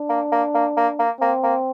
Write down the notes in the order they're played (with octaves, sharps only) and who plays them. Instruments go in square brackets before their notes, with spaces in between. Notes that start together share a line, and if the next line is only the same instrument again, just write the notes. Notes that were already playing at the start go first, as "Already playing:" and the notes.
Already playing: [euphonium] D4
[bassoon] A#3
A#3
A#3
A#3
A#3
[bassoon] A#3 [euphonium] C4
[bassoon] A#3